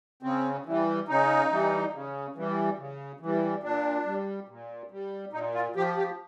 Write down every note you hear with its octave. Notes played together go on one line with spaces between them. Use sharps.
C#3 C4
E3 G3
C#3 D#4
E3 G3
C#3
E3 G3
C#3
E3
G3
A#2 D4
G3
A#2
G3
A#2 D#4
F4
F3 G4
G4